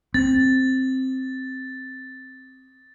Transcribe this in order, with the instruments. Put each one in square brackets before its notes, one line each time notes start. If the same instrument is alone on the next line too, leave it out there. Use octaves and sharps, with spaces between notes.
[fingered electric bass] C4 [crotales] A6